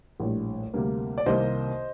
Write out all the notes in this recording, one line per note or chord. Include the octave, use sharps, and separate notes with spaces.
A#1 A2 G3
D2 C3 G3 A#3
D5
C2 C3 D#3 G3 A#3 C5 D#5